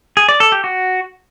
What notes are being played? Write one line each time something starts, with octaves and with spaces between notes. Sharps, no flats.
G#4
D5
A4
G4
F#4